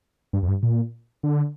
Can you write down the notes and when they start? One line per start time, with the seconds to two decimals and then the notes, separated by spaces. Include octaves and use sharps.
0.33 G2
0.43 F2
0.48 G2
0.63 A#2
1.23 D3